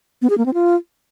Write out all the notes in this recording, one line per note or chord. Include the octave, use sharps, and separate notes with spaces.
B3
G#4
A#3
C4
F4